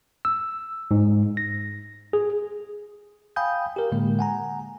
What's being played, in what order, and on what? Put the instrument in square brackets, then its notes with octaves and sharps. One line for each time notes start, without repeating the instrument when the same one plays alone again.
[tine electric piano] E6
G#2
A#6
G#4
F5 G5 G#5 B5 D#6 G6
G4 A#4
A2 D3 G#3 A#3
F#5 G#5 A#5